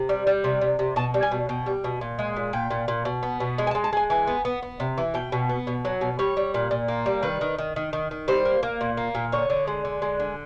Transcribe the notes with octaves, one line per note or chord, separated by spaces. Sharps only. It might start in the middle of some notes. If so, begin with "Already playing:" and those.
Already playing: C3
G3
G3
C3
C3
C3
B2 A5
G3
G#5
B2
B2 G5
G3
B2
A#2
G#3
A#2
A#2 G5
A#2
A#2
B2
B3
B2
G#3
G#5
A5
G#3
A5
G#3 G#5
E3 G#5
B3
B3
B3
C3
E3
B2 G5
B2
B3
B2
F#3
B2
G3 C#5
G3
A#2
A#2
A#3
G3
D#3 B4
D#3
D#3
D#3
D#3
D#3
G3 C5
A#3
A#3
A#2
A#3
A#2
D3 C#5
D3
G#3
D3
G#3
D3